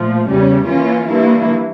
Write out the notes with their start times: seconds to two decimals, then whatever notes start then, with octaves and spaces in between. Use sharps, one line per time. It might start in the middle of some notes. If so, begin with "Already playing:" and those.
Already playing: A#2 F3 A3
0.26 E2 C#3 G3 C#4
0.65 E3 A#3 C#4 F4
1.06 G2 E3 A#3 E4